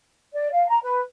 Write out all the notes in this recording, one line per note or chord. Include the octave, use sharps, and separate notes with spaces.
D5
F5
A#5
B4